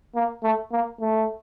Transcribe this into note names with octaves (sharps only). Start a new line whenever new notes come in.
A#3
A3
A#3
A3